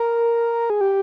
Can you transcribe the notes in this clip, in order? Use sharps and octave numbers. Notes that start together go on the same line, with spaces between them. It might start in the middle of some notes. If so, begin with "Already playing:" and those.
Already playing: A#4
G#4
G4